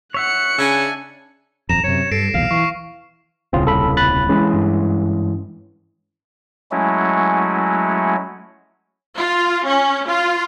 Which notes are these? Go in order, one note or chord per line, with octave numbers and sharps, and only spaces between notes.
C#5 E5 F#5 F#6 C#7
C#3 D4 E5 G#5
D#1 F2 A#5 E7
F#2 C3 C#5
G2 A4 A#6 C7 D7
B1 E2 A#2 F5 C7
E3 C#6
D#1 C2 C#3 C4 F4
A4 B5
B5 F#6 A6
E3 G#3 C#4
G2
F#3 G#3 A3 C#4 E4 F#4
F4
C#4
F4